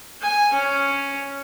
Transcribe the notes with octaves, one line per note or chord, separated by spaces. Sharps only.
G#5
C#4